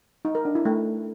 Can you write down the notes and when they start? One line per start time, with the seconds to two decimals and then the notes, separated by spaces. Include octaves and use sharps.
0.25 D#4
0.35 A#4
0.45 D4
0.55 E4
0.65 A3